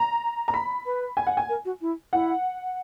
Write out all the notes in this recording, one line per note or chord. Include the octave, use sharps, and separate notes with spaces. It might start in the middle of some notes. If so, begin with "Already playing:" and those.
Already playing: A#5
A#5
B5
B4
G#5
F#5
G#5
A#4
F#4
E4
E4 F#5